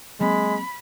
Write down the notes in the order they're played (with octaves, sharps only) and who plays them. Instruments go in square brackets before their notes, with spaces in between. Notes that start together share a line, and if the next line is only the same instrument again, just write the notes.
[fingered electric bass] F#3 A#3 C4 [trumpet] G#3 [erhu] B5